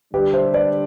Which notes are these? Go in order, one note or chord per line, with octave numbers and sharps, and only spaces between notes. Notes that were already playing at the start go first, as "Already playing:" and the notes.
D3 G3 D4 G4 B4
C5 E5
B4 D5